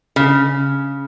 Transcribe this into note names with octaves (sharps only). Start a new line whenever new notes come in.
C#3